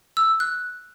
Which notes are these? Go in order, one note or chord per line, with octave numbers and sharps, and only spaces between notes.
E6
F#6